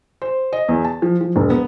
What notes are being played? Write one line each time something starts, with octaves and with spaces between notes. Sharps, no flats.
C5
D#5
E2
A5
F3
F3
E1
B3